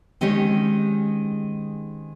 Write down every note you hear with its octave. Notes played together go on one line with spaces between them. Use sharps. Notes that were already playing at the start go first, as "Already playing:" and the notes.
D#3 G#3 C4 C#4 G4 C#5